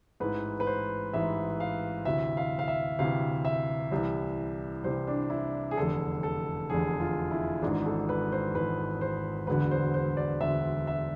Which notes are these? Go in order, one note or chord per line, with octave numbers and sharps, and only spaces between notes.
A1 G#2 E3 B4
B4
C5
A1 G#2 E3 E5
F5
D2 C3 E3 E5
F5
F5
E5
D2 C3 E3 F5
E5
C2 C3 E3
C2 C3 E3 C5
D4
E4
G#4
F1 E2 D3 A4
A4
F1 E2 D3 G#4
F4
E4
G#1 G#2 E3 D4
A4
B4
C5
G#1 G#2 E3 B4
C5
E1 D2 D3 B4
C5
C5
D5
E1 D2 D3 E5
E5